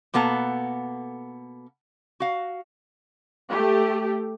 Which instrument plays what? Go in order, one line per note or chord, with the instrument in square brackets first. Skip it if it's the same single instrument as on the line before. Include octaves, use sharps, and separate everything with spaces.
[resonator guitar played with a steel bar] B2 A#3 B3 A4 A#5
F#4 F5
[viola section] A3 G4